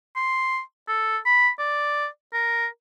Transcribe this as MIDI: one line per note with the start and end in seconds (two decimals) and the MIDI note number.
0.16 0.60 84
0.88 1.18 69
1.26 1.49 83
1.59 2.07 74
2.33 2.66 70